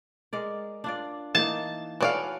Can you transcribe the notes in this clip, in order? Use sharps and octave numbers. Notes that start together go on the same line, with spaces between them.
G#3 A#4 D5
D4 F4 D5
E3 A#3 D#4 A5
E3 F#4 A4 C#5 D5 F5